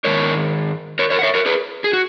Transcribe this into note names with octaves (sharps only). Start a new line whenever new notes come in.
G#2 D#3 G#3 A#4 C#5
A#4 C#5
A#4 C#5
F#5
C#5 E5
A#4 C#5
G#4 B4
G#4
F#4